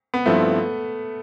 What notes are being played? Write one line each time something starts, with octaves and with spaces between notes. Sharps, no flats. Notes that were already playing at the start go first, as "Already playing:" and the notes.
B3
G2 F3 A3 C4 E4